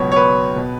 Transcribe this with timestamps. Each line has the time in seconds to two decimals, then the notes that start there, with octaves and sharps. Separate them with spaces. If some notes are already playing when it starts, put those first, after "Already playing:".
Already playing: C#2 B2 F#3 B3 C#5
0.12 C#5
0.16 B4
0.56 B2